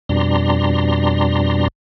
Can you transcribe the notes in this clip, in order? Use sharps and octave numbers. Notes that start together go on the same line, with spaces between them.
F2 B2 G3 D4 A#5 C6